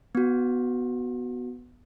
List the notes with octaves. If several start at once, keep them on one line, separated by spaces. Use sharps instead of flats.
B3 F#4